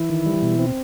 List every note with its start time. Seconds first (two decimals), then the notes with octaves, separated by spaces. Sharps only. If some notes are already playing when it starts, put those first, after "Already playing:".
Already playing: E3 E4
0.09 D#3
0.26 G3
0.43 B2
0.59 C4